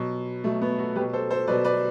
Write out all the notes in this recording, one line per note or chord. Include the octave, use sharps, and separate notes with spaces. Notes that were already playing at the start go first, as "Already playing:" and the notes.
Already playing: B2 F#3
B2 F#3 A3
B3
F#4 A4
B2 F#3 G4 B4
A4 C5
A4 C5
B2 F#3 B4 D5
B4 D5